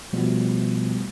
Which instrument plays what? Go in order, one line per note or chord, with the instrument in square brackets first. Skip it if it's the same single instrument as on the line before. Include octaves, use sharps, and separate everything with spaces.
[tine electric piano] B2 F3 G3 A3 B3